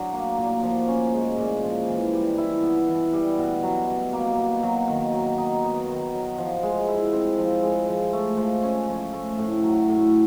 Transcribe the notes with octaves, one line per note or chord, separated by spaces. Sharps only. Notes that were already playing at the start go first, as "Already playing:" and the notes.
Already playing: F#3 D4
A#3
A#2
F3
C#4
G#3
A#2
F3
E3
G3
E4
B3
E3
G3
B2
F#3
B2
A#3
B2
F#3
D#3
F#3
D#4
B3
D#3
F#3
F3
G#3
E4
C4
F3
G#3
F3
A3
F3
C#4
F3
A3
A2
F#3
A2